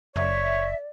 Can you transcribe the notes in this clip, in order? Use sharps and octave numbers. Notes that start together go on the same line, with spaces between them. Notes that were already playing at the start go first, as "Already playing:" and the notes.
F#1 C#5 D5 E5